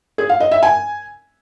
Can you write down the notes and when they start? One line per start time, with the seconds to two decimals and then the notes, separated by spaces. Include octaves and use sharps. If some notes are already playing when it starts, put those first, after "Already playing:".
0.18 G#4
0.29 F5
0.40 D#5
0.51 E5
0.63 G#5